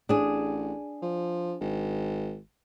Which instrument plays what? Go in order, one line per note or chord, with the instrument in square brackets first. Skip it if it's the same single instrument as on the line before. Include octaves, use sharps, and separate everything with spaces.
[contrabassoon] A1 [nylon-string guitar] D4 G#4
[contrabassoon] F3
G#1